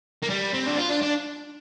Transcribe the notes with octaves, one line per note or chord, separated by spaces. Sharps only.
A#3
G3
C4
D4
F4
D4
D4